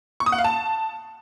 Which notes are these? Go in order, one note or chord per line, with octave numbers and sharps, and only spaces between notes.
C#6
D#6
F#5
F5
A5